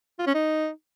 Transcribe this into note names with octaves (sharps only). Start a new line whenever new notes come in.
F4
C#4
D#4